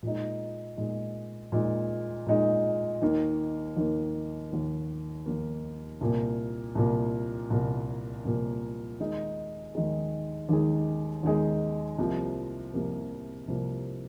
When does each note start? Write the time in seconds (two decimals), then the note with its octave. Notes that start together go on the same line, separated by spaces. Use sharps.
0.03 A#2 G#3 D#4
0.77 A#2 G#3 D#4
1.52 A#2 G#3 D#4
2.27 A#2 G#3 D#4
3.02 D#2 D#3 A#3
3.77 D#2 D#3 A#3
4.51 D#2 D#3 A#3
5.26 D#2 D#3 A#3
6.01 C2 A#2 A#3
6.75 C2 A#2 A#3
7.50 C2 A#2 A#3
8.25 C2 A#2 A#3
9.00 D#2 D#3 G#3 D#4 G#4
9.75 D#2 D#3 G#3 D#4 G#4
10.49 D#2 D#3 G#3 D#4 G#4
11.23 D#2 D#3 G#3 D#4 G#4
11.98 C2 C3 F3 A#3
12.74 C2 C3 F3 A#3
13.48 C2 C3 F3 A#3